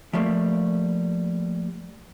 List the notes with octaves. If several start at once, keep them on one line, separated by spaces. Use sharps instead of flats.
F3 G3 A3 A#3